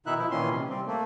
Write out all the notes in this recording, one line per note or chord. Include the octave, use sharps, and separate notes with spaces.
B2 D#3 D#4 E4 E5 F#6
F3 E4
A#2 D#3 E3 C#4 C6
C3
G3 C4
A3 A#3